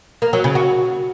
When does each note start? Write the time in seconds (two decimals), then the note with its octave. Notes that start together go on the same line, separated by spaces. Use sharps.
0.22 A#3
0.33 F#3
0.44 C#3
0.55 F#4